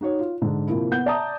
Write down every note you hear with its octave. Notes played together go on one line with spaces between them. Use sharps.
D#4 F#4 C#5
F4
G#2 D3
C3 F3 A#3 E4
B3 F#5 G6
D5 E5 A5 A#5 D#6